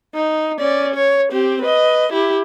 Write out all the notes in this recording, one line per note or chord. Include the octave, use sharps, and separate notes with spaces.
D#4
C#4 D5
C#5
C4 G4
B4 D#5
E4 G4